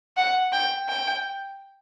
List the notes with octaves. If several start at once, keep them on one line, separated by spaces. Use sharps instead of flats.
F#5
G5
G5